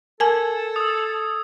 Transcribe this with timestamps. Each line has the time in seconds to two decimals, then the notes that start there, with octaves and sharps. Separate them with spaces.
0.20 A4 A#4 G#5 A5 G#6
0.76 D#6 E6